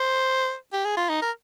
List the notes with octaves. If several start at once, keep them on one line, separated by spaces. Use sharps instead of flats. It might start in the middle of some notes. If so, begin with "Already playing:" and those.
Already playing: C5
G4
G#4
F4
D#4
A#4